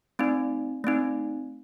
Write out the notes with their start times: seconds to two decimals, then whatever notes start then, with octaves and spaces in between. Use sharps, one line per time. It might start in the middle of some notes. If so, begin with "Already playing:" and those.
0.19 A3 C4 D#4
0.84 A3 C4 D#4